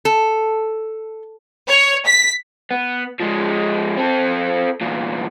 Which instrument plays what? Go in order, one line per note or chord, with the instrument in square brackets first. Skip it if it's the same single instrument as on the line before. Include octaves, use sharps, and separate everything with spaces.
[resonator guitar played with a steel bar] A4
[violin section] C#5
B6
[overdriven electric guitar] B3
F3 G#3
C4 A4
E2 A#2